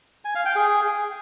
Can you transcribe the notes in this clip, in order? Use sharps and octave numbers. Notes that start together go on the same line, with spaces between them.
G#5
F5
G5
G#4